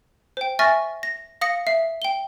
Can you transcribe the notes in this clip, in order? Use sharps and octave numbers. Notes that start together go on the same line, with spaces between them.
C5 G5
E5 G#5 C#6 F6 A6 A#6
A#6
F5 D#6 A#6 C#7
E5 C7
G5 G7